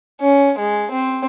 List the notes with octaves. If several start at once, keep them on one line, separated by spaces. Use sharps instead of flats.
C#4
G#3
C4